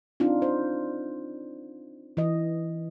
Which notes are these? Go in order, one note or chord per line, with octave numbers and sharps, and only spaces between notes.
C4 D4 D#4 F4
C5
E3 D#5